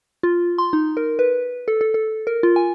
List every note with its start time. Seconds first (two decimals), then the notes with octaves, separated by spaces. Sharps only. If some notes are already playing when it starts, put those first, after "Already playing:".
0.23 F4
0.58 C6
0.73 D#4
0.97 A#4
1.19 B4
1.68 A4
1.81 A4
1.94 A4
2.27 A#4
2.43 F4
2.56 G#5